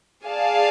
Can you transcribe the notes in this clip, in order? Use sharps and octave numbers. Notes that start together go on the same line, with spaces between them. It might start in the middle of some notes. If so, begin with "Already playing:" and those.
G#4 D5 F5 A5